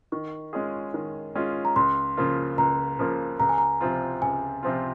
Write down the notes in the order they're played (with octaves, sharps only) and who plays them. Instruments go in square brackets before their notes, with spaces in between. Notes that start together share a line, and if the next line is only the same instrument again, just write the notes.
[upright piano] D#3 [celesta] C#6
[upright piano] G#3 C#4 F4 G#4
D#3
G#3 C#4 F4 G#4
[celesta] A#5
[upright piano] C#2 [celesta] C6
[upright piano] C#3 F3 A#3 F4
[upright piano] C#2 [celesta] A#5
[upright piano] C#3 F3 A#3 F4
[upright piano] C#2 [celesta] A#5
[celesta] G#5
A#5
[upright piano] C3 F3 C4 F4
[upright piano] C#2 [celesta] G#5
[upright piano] C3 F3 C4 F4